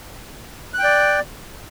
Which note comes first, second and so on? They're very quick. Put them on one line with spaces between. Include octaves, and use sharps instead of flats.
F#6 G5 D5